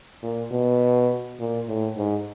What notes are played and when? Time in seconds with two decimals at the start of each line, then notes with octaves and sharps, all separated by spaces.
0.23 A#2
0.51 B2
1.39 A#2
1.68 A2
1.97 G#2